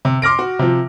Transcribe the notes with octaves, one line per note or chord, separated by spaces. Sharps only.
C3
C6 D6 F6 A#6 D7
F#4
C3 F3